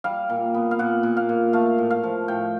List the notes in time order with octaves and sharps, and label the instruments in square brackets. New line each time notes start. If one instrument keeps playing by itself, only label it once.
[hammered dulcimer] G3 F5
A#2
B3
F5
A#2 F#5
A#2
F5
A#2
A3 F5
A2
F5
F3
A2 G5